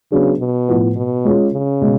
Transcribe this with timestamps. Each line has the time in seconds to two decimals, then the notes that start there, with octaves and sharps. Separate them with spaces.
0.12 C#3 F#3 B3 D4 G#4
0.39 B2
0.68 A2 F3 B3
0.96 B2
1.25 G#3 C#4 F4 G#4
1.53 C#3
1.81 B2 G#3